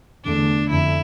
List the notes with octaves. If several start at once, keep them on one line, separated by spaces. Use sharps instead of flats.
E2 D3 A3 D4
F2 D3 E4